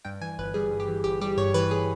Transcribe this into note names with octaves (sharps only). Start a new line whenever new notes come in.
G2 G5
E3 G#5
G1 B4
G3 G#4
G2
G4
E3
G1 G4
G3 G4
G2 C#5
E3 B4
G#4